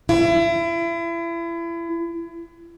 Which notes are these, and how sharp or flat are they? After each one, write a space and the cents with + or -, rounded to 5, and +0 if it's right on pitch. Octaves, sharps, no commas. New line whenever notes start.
E4 +35